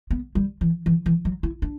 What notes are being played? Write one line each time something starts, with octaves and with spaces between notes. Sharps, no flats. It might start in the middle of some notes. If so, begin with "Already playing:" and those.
B3
G3
E3
E3
E3
F#3
E4
D4